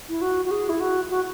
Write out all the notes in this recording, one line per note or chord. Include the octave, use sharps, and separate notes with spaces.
E4
F#4
F#4
G#4
E4
F#4
F#4